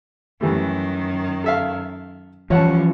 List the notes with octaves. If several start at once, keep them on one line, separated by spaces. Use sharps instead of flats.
F#2 D#3 E3 G3 A3
A4 E5 F5
E3 F3 G3 C#4 C#5 F#5 A5